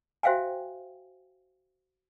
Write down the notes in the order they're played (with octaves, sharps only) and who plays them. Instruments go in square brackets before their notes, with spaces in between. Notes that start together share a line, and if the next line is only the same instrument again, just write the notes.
[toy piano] F#4 C5 E5 F5 G5 G#5